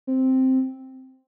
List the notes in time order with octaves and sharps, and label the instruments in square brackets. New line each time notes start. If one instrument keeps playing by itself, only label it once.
[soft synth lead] C4